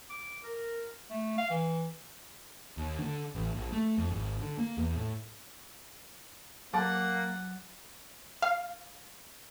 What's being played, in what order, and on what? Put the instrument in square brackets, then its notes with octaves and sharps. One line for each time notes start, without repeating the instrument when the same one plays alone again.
[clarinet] D6
A#4
A3
F5
E3
[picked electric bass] D#2
D3
A1
A#1
A3
F2
G#1
D3
A#3
E2
A2
[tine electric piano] F#3 [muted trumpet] A#3 [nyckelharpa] F#5 [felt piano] A5 D6 A6
[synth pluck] F5